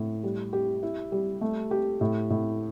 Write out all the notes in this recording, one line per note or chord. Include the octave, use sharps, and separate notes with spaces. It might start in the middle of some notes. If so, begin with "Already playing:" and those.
Already playing: A2
G3
G4
E4
G3
A3
G4
A2
A2